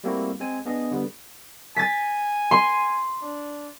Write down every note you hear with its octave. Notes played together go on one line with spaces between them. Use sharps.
G3 A3 A#3 C4 E4 F#4
G#3 C4 G#5
B3 D4 G#4 D#5
D3 G3 B3
G#5 A6 B6
C6
D4